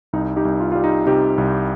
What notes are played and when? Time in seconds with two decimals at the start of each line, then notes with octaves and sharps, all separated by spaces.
0.13 C2 D#4
0.36 D#4 G4
0.45 C2
0.60 F4
0.72 G3 F4
0.84 D#4
1.06 C3 D#4 G4
1.38 C2